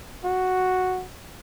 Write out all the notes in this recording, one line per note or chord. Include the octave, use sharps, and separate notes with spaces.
F#4